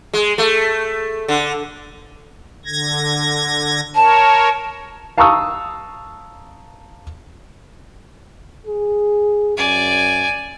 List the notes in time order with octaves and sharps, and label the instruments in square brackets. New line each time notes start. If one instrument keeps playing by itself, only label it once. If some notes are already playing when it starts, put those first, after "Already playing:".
[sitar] G#3
A3
D3
[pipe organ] D3 G#6 A#6
[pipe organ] A#4 C#5 [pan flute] A5
[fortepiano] F5 A5 A#5 C#6 D#6 E6
[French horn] G#4
[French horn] F#2 [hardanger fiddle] D5 G#5